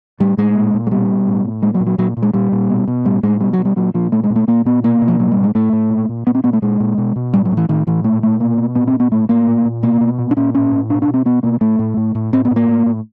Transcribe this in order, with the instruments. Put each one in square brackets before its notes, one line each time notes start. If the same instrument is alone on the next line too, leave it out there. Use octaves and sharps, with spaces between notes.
[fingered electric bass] A2 G3
A2 G#3
A#2
A#2
G#3
B2 G3
B2
A2
A2
A#2 G#3
F#3
A#2
F#3
A#2 F#3
A#2
G#3
A#2 G3
A#2
B2
B2
A2 G3
A2 G#3
B2 G3
F#3
B2
G3
A#2 F#3
A#2 F3
A#2 A3
G#3
A#2
A3
A#2 A#3
A#2 B3
B2 A#3
B2
F3
A2 F#3
A2 G3
G#3
A2 A3
A2
A#2
A#2
A#2 B3
C4
A#2 B3
A3
A#2 G#3
A#2
B2
B2
A2 G3
F#3
A2
E3
A2 D#3
A2 E3
A#2 A3
A#2 A3
B2 A#3
B2
A#2 B3
C4
A#2
B3
A2 A3
A2 A#3
A#2
A#2
B2 A#3
B2
A#2
D4
A#2 C#4
A2 C#4
A2
B2 D4
D4
B2
C4
B2 B3
B2 A#3
A2 A3
A2
A2
A2
A2 C4
B3
A2
A#3
A2
A2